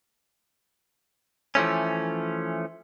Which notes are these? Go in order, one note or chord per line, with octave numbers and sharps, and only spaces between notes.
E3 F3 A3 C#4